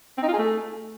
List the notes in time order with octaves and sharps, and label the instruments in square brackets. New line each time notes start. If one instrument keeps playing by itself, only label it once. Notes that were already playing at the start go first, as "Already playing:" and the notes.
[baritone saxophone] C4
D#4
F4
G#4
A3